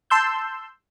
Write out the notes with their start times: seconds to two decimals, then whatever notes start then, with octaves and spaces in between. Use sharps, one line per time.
0.10 A5 C6 E6 G6